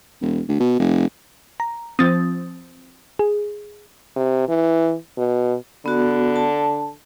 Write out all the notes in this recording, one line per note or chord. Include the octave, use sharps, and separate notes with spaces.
E1
D2
B2
F1
A#5
F3 C4 D#6 A6
G#4
C3
E3
B2
D3 B3 F#4
A5